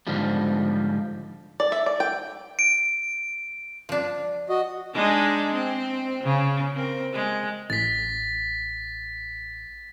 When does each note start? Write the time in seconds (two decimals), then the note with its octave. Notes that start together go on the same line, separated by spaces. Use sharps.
0.07 G#2 D3 F3 G3
1.60 D5
1.72 E5
1.86 D5
2.00 G5
2.59 D7
3.89 F3 D4
4.49 F#4 D#5
4.94 G#3 D4 D#4
5.54 C4
6.24 C#3
6.75 C4 A#4
7.13 G#3
7.70 A1 A6 B6